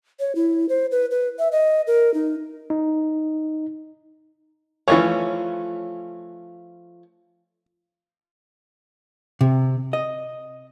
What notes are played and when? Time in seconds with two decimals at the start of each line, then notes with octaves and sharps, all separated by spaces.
0.20 C#5
0.35 E4
0.69 C5
0.92 B4
1.11 B4
1.39 E5
1.52 D#5
1.87 A#4
2.14 D#4
2.70 D#4
4.88 E3 F3 A3 C#4 C#5
9.41 C3
9.93 D#5